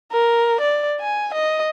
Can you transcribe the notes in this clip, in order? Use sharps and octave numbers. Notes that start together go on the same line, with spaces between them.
A#4
D5
G#5
D#5